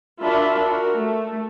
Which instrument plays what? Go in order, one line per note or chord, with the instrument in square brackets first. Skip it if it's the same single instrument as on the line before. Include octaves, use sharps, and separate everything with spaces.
[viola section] D4 F4 F#4 A#4 E5 B5
F#4 A#4
A3